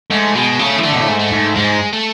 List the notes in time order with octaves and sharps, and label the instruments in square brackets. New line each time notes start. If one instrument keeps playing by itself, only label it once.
[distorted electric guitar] G#2 [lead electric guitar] A3
[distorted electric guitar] B2 [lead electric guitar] G#3
[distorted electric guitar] C#3 [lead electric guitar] A3
[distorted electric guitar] E3
[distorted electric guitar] D3 [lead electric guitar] A3
[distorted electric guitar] B2
A2
G#2
[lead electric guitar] A3
[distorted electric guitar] G#2
[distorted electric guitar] G#2 [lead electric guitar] G#3
[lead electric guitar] A3